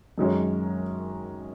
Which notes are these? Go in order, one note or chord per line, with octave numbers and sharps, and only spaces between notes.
F#2 D#3 G#3 C#4